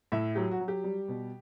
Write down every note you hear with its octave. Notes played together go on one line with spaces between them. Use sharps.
A2 E5
F#3 G4
F#4
F#3
G4
G3
B2